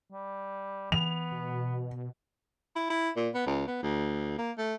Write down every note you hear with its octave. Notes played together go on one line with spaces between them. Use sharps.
G3
E3 B3 F7
B2
E4
E4
A#2
B3
C#2
B3
D2
A#3
A3